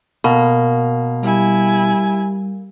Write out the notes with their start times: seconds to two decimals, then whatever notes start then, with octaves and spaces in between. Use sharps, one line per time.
0.24 B2 A#3
1.23 G3 E4 G#5